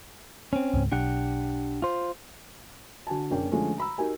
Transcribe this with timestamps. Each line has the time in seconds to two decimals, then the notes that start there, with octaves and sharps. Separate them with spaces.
0.53 C4 C#4
0.74 C#2 G#2
0.92 B1 D4 G4 F#5
1.82 F4 C5
3.07 D3 F#4 G#5 A5
3.31 F#1 A#3 C#4 D4 G5
3.52 D3 F3 G#3 A3 C#4
3.78 A#5 B5 E6
3.98 D#4 F#4 G4 A#4 G#5